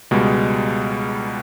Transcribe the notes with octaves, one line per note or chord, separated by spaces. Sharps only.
C#2 B2 G3 G#3